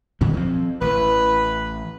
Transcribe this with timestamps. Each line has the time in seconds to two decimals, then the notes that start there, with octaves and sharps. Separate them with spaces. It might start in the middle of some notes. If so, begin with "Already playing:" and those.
0.21 A#2 D#3 F#3
0.34 F3 C4
0.81 A1 E3 B4